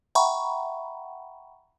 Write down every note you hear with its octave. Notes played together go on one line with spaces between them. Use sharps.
E5 F#5 G5 A#5 B5 C#6